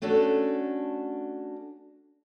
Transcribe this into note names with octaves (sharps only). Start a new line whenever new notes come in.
A3 C#4 D4 F#4 A4